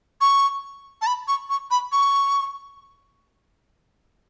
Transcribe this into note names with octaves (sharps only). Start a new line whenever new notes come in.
C#6
A5
B5
C#6
C#6
B5
C#6